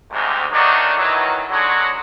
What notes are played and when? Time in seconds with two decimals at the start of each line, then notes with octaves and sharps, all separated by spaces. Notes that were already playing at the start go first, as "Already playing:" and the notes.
0.12 D2 G#2 C3
0.52 D3 D#3 F#3 A3 D4 D#4
0.98 D#3 E3 F#3
1.50 D3 F#3 G#3